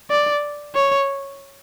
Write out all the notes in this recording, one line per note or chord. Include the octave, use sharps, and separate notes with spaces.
D5
C#5